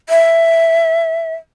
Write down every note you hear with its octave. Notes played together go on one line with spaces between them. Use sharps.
E5